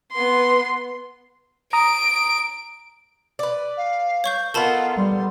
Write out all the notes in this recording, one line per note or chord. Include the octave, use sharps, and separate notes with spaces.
B3 C6
A#5 D#6 D7
B4 D5
F5
C#5 C#6 G6
B3 D#4 F4 A4 A#4 A5 B5
G3 C6